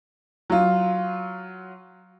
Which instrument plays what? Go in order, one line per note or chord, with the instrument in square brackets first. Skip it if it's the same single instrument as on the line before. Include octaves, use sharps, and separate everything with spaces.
[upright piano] F#3 F4